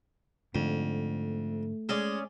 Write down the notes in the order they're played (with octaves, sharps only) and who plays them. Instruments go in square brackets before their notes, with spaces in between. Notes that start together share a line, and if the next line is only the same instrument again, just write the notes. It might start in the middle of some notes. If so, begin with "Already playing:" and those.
[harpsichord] F2 [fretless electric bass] G#2 D3 [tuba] A3
[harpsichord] G#3 [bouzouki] C#4 G#4 D5